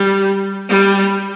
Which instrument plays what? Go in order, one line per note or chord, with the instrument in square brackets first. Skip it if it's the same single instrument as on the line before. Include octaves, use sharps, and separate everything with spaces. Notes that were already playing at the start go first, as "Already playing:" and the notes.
Already playing: [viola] G3
G3